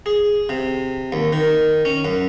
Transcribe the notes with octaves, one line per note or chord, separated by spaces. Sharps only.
G#4
C3
D#2
D#3
C#4
F#2